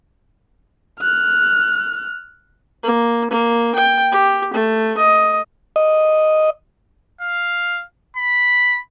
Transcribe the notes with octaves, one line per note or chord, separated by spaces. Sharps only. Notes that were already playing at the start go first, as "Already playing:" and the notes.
F6 F#6
A#3
A#3
G5
G4
A3
D#5
D#5
F5
B5